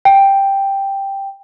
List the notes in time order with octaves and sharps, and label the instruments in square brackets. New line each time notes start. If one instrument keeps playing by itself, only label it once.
[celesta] G5